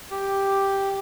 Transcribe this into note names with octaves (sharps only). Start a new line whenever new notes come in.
G4